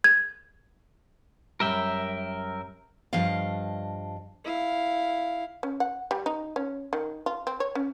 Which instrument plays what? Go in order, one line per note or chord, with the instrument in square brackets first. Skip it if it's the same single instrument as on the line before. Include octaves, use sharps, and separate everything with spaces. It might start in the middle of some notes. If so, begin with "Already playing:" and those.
[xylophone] G#6
[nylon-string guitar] F#2 G3 [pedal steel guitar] A#4 E5 G5
[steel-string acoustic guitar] G2 F3 D4 D#5 F5
[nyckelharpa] E4 F5
[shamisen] C#4
F#5
G3
D#4
C#4
D#3
F4
C4
C#5
C#4